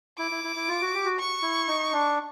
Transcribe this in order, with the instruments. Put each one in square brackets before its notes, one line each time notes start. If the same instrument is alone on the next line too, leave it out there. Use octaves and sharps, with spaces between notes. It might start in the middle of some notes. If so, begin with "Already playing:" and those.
[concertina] E4 [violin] D6
[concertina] E4
E4
E4
F4
F#4
G4
F#4
[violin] C#6
[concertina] E4
D#4
D4